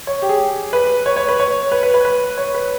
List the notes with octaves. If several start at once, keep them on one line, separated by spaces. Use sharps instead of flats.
C#5
G4
G#4
B4
C#5
C#5
B4
C#5
B4
B4
B4
B4
C#5
B4